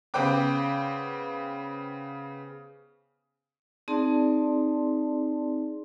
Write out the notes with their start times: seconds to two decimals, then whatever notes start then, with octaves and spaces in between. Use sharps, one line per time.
0.14 C#3 B3 B4 C5 G5 D6
3.88 C4 D#4 G#4 D5 A5 C6